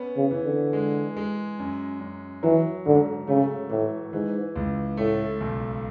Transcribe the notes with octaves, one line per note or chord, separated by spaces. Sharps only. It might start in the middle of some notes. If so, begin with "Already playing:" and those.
Already playing: B3 C#4
C#3
E3
D3
G#3
G#3
F#2
F#2
E3 F#3
G#2 D3
C#3 A3
A2 E3
G#2 E3
C#2
A2 A3
B1